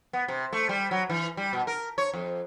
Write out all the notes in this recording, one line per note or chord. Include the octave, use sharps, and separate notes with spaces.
B3
C3
A3
G3
F#3
E3
G3
B2
A#4
C#5
F2